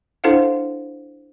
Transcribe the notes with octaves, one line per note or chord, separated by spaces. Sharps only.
D4 E4 A4 C5 F5 F#5